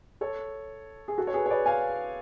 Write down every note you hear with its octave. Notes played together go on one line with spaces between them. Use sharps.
A4 C#5
G#4
F#4 A4
C#5
G#4 B4
C#5
B4 D5
F5 G#5